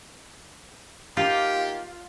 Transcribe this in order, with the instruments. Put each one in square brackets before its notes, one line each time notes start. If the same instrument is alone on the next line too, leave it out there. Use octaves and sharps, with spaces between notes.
[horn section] A#3 D#4 G4 [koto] F4